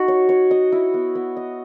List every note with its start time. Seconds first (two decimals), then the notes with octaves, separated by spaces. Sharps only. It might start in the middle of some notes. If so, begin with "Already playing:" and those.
Already playing: D#4 F#4
0.08 C#5
0.29 C#5
0.51 D#5
0.72 E4
0.94 B3
1.15 B3
1.37 D#5